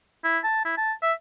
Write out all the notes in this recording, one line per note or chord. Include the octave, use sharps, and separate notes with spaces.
E4
A5
E4
A5
E5